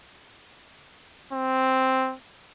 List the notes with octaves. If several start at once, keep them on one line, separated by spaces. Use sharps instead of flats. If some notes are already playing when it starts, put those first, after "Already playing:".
C4